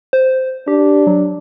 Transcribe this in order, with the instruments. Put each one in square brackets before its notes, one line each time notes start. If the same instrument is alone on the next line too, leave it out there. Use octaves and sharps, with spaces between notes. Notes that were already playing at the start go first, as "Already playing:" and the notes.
[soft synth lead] C5
[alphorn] D4 [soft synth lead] G4
[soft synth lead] F#3